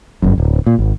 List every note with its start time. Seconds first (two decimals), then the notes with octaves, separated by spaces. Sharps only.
0.22 G1 F#2
0.38 D1
0.67 A#2
0.79 G#1